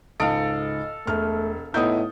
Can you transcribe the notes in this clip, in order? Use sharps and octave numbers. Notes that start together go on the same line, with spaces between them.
C#2 G#2 A4 D#5 F5 D7
E1 A3 F6
A2 B3 D#4 E4 D#6 G6